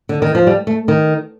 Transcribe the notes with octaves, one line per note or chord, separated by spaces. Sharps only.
D3
D#3
F3
G3
A3
D#3